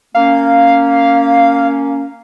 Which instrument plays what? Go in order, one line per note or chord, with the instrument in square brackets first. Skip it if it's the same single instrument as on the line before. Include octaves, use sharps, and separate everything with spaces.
[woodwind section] A#3 C#4 [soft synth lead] F5